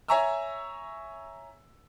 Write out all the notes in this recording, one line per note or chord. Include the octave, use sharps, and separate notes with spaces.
C#5 E5 G#5 A#5 C#6 E6